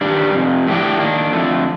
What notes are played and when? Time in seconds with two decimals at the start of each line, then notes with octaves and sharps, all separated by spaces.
0.01 G2 D#3 G3 D4
0.34 F2 C3
0.67 A2 A3 D4 G4
1.00 D#3 A#3 D4
1.32 F2 D3 A3